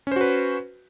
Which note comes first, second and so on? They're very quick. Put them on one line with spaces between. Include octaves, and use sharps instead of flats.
C#4 C5 F#4 B4